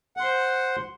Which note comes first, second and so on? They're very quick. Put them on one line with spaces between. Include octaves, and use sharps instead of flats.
F#5 C6 C5